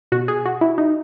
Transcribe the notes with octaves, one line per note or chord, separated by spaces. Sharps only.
B2 F#4
G#4
F#4
E4
D#4